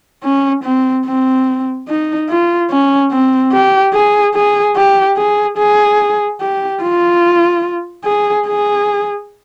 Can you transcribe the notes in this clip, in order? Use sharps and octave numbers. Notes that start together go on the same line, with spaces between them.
C#4
C4
C4
D#4
F4
C#4
C4
G4
G#4
G#4
G4
G#4
G#4
G4
F4
G#4
G#4